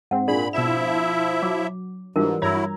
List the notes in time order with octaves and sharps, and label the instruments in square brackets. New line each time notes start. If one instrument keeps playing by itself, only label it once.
[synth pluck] G#2 C4 [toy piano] F#5
[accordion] A#2 B5 [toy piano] D4 D5 [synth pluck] G#4
[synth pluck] B2 E7 [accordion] F3 E4 E5
[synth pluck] F#3 [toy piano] D6
[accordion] G#2 [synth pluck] E3 G3 D4 [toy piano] F4 F#4 A#4
[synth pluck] G2 A#5 G#6 [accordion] F#3 E4 [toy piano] C#5 E6